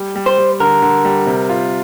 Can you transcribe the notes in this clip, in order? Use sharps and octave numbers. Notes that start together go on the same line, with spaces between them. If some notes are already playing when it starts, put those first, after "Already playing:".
Already playing: G3
G3
C5
G3
D3 A#4
D3
G3
C3
F4